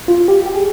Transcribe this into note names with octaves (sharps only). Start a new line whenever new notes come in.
F4
G4
G4
G#4